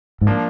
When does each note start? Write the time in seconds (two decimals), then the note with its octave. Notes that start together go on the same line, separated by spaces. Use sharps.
0.21 G#2
0.27 F3 A#3 D4